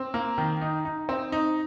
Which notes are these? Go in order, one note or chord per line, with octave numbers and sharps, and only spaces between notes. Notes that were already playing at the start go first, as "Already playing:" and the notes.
Already playing: C4
A#3
D#3
D#4
D#4
C4
D#4